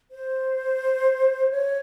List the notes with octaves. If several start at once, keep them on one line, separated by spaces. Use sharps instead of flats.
C5
C#5